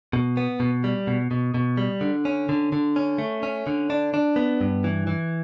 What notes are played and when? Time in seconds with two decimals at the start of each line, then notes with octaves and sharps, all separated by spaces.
0.13 B2
0.37 B3
0.60 B2
0.84 G3
1.07 B2
1.31 B2
1.54 B2
1.77 G3
2.01 D3
2.25 C#4
2.49 D3
2.72 D3
2.96 C#4
3.18 A3
3.43 C#4
3.67 D3
3.90 D4
4.14 D4
4.36 B3
4.61 G2
4.84 E3
5.07 E3